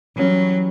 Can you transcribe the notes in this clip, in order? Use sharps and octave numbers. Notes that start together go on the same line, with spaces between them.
E3 F#3 G3 C#4